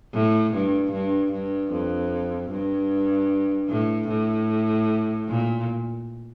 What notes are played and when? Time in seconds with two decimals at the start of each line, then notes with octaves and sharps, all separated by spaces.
0.14 A2
0.53 G2
0.93 G2
1.32 G2
1.71 F2
2.51 G2
3.69 A2
4.09 A2
5.28 A#2